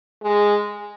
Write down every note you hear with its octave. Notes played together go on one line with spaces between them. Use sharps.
G#3